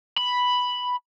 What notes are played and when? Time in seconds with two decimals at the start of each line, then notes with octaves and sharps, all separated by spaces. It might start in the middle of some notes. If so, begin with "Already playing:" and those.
0.18 B5